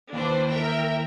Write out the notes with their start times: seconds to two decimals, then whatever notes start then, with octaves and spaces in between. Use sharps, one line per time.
0.13 D#2 E3 D4 B4 C5
0.49 A#4 E5 G5